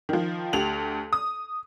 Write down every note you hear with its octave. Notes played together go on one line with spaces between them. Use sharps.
D#3 F3
D2 G4 F7 F#7
D#6